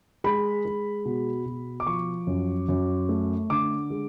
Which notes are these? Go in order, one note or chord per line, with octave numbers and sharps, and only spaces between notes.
G#3 B5
G#3
B2
B2
D6
F3 C#6
F#2
F#2
A3
D3 D6
G#3